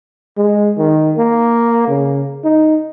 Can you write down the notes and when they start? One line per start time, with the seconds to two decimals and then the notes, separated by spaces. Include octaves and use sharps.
0.37 G#3
0.78 D#3
1.17 A#3
1.88 C#3
2.44 D#4